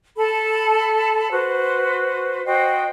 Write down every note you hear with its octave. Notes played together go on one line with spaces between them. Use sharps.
A4 A5 B5
F#4 B4 C5
F#4 C5 D#5 G5